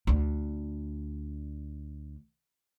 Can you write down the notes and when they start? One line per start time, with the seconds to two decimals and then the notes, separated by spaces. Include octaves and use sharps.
0.07 D2 D4